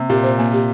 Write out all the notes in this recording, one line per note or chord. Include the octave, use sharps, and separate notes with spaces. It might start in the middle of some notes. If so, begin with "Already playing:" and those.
Already playing: C3 A#3
A#2 G4
C5
A#3
G4